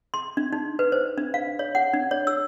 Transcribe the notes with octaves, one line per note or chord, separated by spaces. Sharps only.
C6
D4
D#4
B4
C5
D4
F5
C#5
F#5
D4
C#5
E6